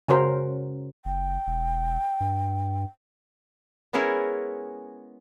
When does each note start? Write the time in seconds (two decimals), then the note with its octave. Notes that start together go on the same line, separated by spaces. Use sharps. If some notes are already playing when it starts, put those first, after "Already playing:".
0.08 C#3 C#4 F#4 A#4 C5
1.05 F#1 G5
1.47 E1
2.20 G2
3.93 G#3 B3 C#4 E4 G#4 A#4